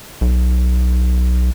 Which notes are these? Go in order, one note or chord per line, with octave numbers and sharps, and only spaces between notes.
B1